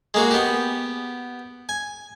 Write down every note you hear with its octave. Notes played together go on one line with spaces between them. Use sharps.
G#3 A#3 F#4
B3 G4
G#5